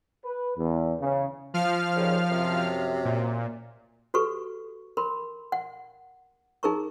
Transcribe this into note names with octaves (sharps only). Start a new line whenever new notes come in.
B4
E2
C#3
F3 F5 F6
D#2 A#2 C#3
F#2 C3
A#2
F#4 G4 A4 B4 C#6
A#4 B5 C6
F#5
D#4 G#4 A#4 A#5 C#6